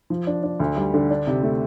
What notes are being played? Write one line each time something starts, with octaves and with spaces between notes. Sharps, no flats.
F3
D4
D4
D2
G3
D3
D4
C3
A3